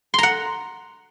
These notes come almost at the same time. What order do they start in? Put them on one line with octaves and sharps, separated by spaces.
C6 A#5 F#5